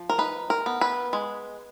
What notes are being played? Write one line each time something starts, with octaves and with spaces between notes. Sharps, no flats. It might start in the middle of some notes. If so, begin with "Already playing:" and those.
Already playing: F3
A#4
D#4 B4
A#4
B3
B4
G#3